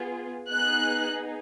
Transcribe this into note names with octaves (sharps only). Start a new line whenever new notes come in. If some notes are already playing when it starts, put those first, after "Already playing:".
Already playing: B3 F4 G#4
B3 D#4 G#4 F#6